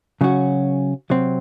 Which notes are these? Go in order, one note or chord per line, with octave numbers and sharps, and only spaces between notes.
C#3 F#3 C#4 F#4
C3 F#3 C4